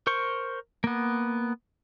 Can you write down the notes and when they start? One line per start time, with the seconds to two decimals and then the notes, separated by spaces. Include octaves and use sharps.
0.07 A#4 C5 C#6
0.84 A#3 B3